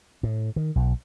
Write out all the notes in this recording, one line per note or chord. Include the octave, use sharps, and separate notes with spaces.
A2
D#3
B1